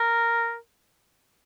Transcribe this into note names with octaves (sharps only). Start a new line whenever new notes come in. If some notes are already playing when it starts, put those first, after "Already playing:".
Already playing: A#4